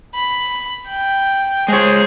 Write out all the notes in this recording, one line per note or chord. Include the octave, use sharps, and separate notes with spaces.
B5
G5
G#3 G#4 C5 C#5